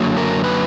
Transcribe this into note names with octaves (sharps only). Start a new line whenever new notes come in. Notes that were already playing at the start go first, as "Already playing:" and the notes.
Already playing: F#2 D3 F#3 A#3
A#4
B4